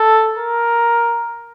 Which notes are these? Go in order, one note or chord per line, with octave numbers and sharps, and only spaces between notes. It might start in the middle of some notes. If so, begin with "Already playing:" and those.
Already playing: A4
A#4